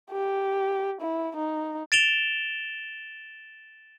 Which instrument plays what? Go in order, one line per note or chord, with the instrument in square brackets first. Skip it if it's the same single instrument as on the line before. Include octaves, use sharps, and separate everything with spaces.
[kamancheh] G4
E4
D#4
[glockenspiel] A6 D7 E7 F7 G7